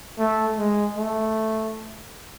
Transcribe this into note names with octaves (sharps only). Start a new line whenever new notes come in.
A3
G#3
A3